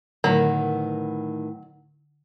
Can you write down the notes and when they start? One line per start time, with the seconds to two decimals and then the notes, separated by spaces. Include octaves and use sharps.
0.24 A2 D3 D#3 F#3 B3